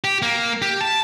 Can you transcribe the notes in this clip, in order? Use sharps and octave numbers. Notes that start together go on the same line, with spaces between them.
G4
A#3
G4
A5